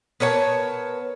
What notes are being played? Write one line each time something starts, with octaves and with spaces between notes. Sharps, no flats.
B3 A#4 C#5 A5